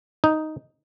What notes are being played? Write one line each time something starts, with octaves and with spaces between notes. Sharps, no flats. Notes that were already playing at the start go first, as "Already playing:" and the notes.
D#4